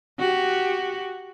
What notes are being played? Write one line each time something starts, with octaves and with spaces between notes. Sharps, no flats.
F#4 G4